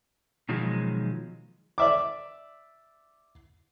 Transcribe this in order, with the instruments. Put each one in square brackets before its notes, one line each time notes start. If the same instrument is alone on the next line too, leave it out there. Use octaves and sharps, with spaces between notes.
[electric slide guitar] B2 D#3 F3 F#3 G#3
[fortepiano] D5 E5 D6